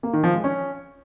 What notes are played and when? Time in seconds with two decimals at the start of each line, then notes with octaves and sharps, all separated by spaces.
0.03 A#3
0.13 D#3
0.24 F3
0.34 G#3
0.44 C#4